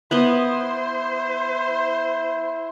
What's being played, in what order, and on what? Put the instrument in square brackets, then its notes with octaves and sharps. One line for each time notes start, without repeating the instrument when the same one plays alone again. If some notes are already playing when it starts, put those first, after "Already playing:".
[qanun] B3 B4 D#5 [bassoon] E4 [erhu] C5